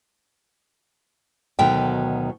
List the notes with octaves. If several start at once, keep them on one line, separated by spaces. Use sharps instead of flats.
D2 B2 D#3 F#3 G5